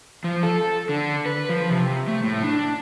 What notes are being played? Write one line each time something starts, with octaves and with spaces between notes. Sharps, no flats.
F3
A4
D3
B4
F3
C3
A3
A2
D4